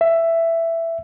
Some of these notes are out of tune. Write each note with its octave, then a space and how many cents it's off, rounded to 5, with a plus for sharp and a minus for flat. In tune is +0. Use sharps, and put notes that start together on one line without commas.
E5 +10